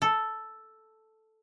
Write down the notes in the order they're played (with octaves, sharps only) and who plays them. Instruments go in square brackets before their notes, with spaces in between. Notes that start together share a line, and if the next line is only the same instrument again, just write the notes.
[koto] A4